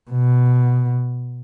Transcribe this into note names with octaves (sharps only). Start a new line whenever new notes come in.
B2